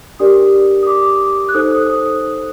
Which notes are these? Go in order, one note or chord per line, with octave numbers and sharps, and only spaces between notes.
D4 G4 A#4 D5 D#6
D#6
D6
F#6
D#4 A4 C5 D#6
D#6
D#6